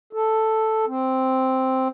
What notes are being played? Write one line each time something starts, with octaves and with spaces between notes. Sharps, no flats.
A4
C4